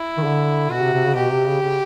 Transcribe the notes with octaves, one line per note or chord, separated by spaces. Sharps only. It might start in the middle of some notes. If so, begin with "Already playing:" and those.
Already playing: E4
D#3
D3
B2 F#4
C3
C3
C#3
B2 G4
C3
C#3
C#3